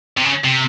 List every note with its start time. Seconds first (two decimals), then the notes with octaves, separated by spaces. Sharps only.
0.18 C3
0.25 C#3
0.44 C3